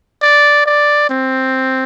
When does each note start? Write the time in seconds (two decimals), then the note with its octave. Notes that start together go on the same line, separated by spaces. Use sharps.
0.22 D5
0.66 D5
1.10 C4